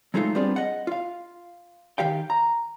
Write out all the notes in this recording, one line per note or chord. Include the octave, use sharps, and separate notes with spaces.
F#3 G#3 A3 D#4 F4
G3 B3 C4 D4 F4 G#4
D#5 F#5
F4 F5
D#3 G4 F5 G5
A#5